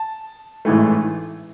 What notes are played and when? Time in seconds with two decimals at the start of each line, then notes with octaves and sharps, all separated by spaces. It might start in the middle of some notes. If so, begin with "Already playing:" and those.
Already playing: A5
0.65 A1 G#2 E3 A3